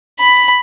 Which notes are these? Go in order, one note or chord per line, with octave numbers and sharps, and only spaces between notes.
B5